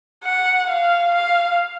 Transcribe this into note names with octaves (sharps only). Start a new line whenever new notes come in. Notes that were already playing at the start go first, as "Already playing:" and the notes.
F#5
F5
F5